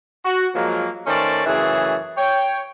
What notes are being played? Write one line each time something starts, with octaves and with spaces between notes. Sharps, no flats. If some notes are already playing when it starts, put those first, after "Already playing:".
F#4
F3 F#3 G#3 A#3
D#3 A3 C#4 C5 D5 A5
F#2 C#3 E3 A3 G#4 C#5
C#5 G5